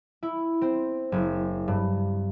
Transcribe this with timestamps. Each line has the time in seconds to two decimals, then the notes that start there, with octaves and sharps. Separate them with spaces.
0.23 E4
0.62 C4
1.12 F#1
1.68 G2